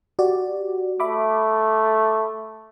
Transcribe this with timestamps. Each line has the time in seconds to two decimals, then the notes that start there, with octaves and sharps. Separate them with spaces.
0.19 F#4 G4 D5
1.00 A3 E5 B5 D6